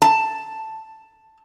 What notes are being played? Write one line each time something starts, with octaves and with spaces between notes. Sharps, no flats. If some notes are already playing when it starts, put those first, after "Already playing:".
A5